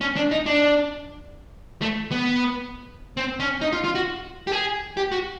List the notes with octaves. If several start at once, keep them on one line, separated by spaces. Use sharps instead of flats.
C#4
D4
D#4
D4
A3
B3
C4
C#4
D#4
F4
F4
F#4
G4
G#4
G4
F#4